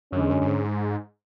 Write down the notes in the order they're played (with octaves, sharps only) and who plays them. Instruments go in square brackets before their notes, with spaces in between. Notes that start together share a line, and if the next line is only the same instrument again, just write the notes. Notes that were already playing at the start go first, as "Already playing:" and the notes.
[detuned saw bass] F#2 [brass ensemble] D3 G#3 C#4
[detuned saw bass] E2
F#2
F#2
G#2